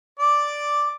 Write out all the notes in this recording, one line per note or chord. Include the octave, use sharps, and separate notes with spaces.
D5 D6